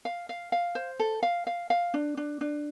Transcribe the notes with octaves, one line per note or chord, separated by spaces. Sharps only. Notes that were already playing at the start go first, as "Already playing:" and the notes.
F5
F5
F5
C5
A4
F5
F5
F5
D4
D4
D4